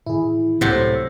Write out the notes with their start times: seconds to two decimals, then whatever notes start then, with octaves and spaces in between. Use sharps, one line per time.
0.06 A2 D#3 E3 E4 G#4
0.61 C#2 A2 C3 F#3 G4